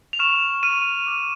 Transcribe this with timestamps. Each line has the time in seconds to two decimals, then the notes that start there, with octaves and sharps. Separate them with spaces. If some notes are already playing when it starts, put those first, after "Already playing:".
0.13 F7
0.19 C#6 F6 E7
0.63 C#6 F6 D#7
1.06 D6 F6